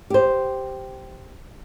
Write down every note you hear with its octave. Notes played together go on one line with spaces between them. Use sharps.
G4 C5